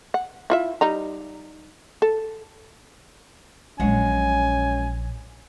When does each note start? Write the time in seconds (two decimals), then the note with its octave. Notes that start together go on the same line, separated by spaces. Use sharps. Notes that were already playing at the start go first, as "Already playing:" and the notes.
0.14 F#5
0.50 E4 F4 E5
0.81 G3 D#4 A#5
2.02 A4
3.80 A#1 A#2 F#3 G#3 C#4 F#5 G#5